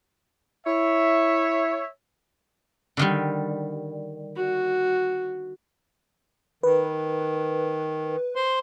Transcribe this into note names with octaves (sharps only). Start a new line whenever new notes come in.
E4 C#5 E5
D3 D#3 G3
F#4
D#3 B4
C5 C6